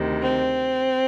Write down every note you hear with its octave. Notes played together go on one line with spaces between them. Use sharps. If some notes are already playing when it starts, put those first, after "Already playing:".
Already playing: D2 C3 D#3
C4